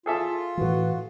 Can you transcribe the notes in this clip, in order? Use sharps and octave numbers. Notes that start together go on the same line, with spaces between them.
F4 G#4 A4 E5
A2 E3 F#4